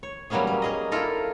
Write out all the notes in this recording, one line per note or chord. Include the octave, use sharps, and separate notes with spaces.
C#5
F#3 G3 A#3 B3 C#4 G#4
A#3
C#4 G#4 D#5
E4 F4 A4 A#4 D5